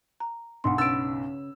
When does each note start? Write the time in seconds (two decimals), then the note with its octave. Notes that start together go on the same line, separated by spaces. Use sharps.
0.20 A#5
0.64 B1 G2 F#5 C6
0.78 C#3 C#4 B4 E6 A6 D7